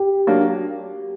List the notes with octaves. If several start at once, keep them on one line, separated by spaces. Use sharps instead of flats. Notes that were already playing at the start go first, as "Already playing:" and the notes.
Already playing: G4
F#3 A#3 D4